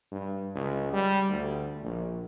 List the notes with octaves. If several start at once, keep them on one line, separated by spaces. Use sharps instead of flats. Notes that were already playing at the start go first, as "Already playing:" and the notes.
G2
C#2
G3
D2
A#1